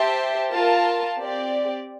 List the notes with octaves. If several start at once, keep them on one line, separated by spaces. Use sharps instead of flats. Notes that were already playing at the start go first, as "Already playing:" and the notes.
Already playing: G4 C5 E5 A5
F4 A#4 F5 A5
C4 G4 D5